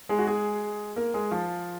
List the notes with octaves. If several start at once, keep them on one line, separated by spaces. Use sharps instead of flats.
G#3 G#4
F#4
G#3 G#4
A#3 A#4
G#3 G#4
F3 F4